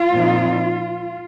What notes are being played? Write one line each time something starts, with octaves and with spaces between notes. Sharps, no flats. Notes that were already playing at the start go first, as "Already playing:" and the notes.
Already playing: F4
A#2 F3 C4 D#4